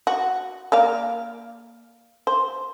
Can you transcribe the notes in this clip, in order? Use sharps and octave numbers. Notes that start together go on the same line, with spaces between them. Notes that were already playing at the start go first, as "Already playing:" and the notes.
F#4
A#3 D5 F5
C5